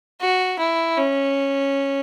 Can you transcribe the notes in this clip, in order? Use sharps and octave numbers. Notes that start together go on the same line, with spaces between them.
F#4
E4
C#4